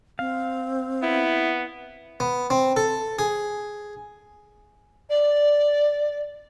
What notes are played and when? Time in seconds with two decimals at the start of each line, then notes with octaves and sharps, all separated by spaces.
0.19 C4 F5
1.03 B3 E4
2.20 B3
2.50 C4
2.77 A4
3.19 G#4
5.09 D5